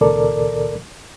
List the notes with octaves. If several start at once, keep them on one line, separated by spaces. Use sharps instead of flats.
C#2 A#2 D#3 A4 A#4 D5